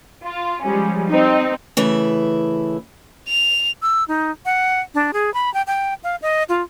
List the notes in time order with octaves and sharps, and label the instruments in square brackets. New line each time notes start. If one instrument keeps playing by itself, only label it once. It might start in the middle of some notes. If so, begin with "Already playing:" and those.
[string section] F4
F3 G3 G#3 C#4
C4 D#4
[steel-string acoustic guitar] C#3 E3 A3 E4
[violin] F7
[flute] E6
D#4
F#5
D4
G#4
B5
G5
G5
F5
D#5
F4